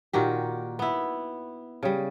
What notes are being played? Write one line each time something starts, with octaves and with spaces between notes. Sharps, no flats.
A#2 D#3 F#4 G4
B3 E4
C#3 G3